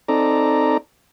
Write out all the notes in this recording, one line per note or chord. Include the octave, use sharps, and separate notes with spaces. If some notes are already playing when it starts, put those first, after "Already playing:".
C4 D#4 A4 D5 A#5